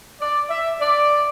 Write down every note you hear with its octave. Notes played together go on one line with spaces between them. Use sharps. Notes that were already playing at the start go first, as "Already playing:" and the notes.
D5
E5
D5